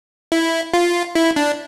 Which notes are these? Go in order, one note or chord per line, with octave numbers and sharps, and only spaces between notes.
E4
F4
E4
D4